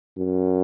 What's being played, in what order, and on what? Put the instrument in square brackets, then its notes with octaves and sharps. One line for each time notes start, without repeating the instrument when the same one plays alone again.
[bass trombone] F#2